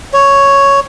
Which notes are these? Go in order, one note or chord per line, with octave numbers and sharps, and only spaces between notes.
C#5